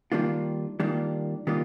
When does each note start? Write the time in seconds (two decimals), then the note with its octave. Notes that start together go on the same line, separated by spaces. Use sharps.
0.12 D#3 G3 A#3 D4 F4
0.80 D#3 G3 A#3 D4 F4
1.47 D#3 G3 A#3 D4 F4